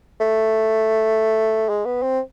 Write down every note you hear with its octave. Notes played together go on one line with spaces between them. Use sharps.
A3
G#3
B3
C4